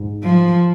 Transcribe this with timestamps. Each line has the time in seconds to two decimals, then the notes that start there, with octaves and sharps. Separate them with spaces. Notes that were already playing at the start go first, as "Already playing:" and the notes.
Already playing: G#2
0.23 F3